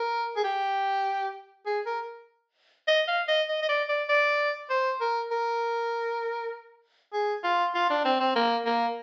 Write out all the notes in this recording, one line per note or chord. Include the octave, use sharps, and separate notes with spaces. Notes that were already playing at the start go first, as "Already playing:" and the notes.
Already playing: A#4
G#4
G4
G#4
A#4
D#5
F5
D#5
D#5
D#5
D5
D5
D5
C5
A#4
A#4
G#4
F4
F4
D4
C4
C4
A#3
A#3